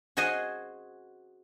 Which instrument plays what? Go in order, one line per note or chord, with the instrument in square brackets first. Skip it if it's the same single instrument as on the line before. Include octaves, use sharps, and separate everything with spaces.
[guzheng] F#4 G#4 C5 D#5 F#5 G#5